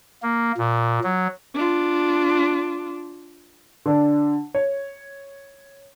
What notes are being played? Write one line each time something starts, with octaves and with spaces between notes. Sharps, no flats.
A#3
A#2
F#3
D4 F4
D3 D4
C#5